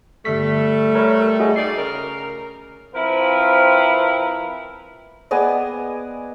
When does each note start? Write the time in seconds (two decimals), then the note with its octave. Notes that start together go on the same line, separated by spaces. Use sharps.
0.25 G1 G3 A3 B6
0.95 A#4 C#5 B5
1.40 F#4 G#4 D#5
1.56 D#4 G#4 D5 C7
1.77 C#3 A#4
2.94 F3 C4 E4 A#4 B4 F5
5.31 B3 G#4 D5 D#5